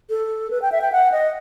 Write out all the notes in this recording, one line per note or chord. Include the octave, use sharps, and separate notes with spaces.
A4
B4
G5
E5
G5
F#5
D#5